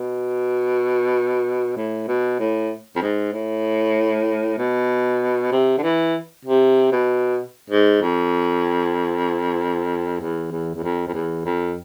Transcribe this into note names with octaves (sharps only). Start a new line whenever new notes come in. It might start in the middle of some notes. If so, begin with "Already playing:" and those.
Already playing: B2
A2
B2
A2
F2
G#2
A2
B2
C3
D3
E3
C3
B2
G#2
F2
E2
E2
E2
F2
F2
E2
F2